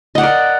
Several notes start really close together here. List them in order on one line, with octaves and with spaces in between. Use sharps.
D#5 F#5 D5 A#4